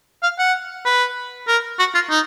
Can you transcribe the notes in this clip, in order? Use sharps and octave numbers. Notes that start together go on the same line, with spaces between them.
F5
F#5
B4
A#4
F#4
F4
D#4